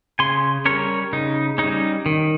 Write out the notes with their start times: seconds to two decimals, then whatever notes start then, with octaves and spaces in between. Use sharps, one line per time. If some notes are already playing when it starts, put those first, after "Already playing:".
0.19 C#3 G#5 C6
0.65 G3 C#4 A#4 C#5
1.13 C#3 D#4
1.58 G3 C#4 D#4
2.06 D#3